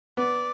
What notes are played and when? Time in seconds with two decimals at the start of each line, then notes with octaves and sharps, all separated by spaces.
0.17 B3 D5